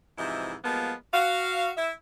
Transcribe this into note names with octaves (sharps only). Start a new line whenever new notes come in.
G#2 C3 E3 F3 E4 D#5
F3 G3 G#3 A#3 B3 F4
F#4 F5
E4 E5